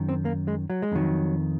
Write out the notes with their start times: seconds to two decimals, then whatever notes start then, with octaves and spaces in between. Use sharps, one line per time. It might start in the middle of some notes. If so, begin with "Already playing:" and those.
Already playing: F#2 D#3
0.09 C4
0.25 A#3
0.48 G#3
0.70 F#3
0.82 G#3
0.92 F2 D#3 F#3